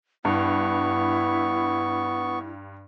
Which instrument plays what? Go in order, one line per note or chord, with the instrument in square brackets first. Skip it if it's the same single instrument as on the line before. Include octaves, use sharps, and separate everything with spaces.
[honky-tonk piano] G2 [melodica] B3 C#6 [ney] E4